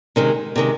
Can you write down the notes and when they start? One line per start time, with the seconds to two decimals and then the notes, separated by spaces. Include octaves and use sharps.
0.16 C3 D#3 G#3
0.56 C3 D#3 G#3